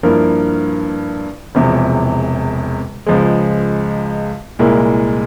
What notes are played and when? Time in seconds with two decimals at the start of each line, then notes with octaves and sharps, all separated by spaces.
0.03 G2 F3 A#3 E4 A#4
1.55 E1 E2 C3 F3
3.07 C#2 C#3 F3 G#3
4.59 C2 A#2 G#3 E4 A#4